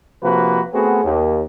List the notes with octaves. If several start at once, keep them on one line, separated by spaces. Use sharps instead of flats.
C3 F3 A#3 F#4 B4
A3 B3 C4 F#4 G#4
D#2